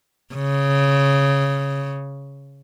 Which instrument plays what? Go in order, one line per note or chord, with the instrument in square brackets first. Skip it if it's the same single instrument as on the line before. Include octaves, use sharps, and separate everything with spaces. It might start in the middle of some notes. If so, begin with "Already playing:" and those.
[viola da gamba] C#3